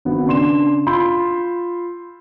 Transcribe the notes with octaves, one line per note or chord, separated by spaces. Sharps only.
G#1 B3 F#4
C#3 D4 C6 E7
F4 B5 C6 E6 G6